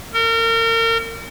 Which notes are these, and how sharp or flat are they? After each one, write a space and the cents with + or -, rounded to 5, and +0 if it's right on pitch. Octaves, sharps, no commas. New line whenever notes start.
A#4 -35